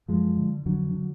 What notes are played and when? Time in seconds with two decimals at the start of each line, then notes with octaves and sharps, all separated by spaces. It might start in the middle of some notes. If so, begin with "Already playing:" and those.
0.08 F#2 F3 G#3
0.37 D3
0.66 F2 D3 F#3
0.94 D3